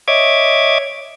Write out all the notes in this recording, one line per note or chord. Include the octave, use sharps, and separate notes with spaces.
C#5 D#5 E5 D6 G#6